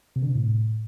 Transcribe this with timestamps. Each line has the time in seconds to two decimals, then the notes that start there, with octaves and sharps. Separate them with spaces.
0.16 C3
0.22 D3
0.29 C3
0.35 A2